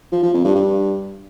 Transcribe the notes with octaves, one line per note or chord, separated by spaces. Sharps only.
F3
F3
F2
G2
G2